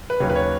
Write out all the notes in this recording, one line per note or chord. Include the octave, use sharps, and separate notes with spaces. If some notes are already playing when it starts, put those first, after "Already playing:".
B4
D#2 C#3 F#3 C#5
B4
C#5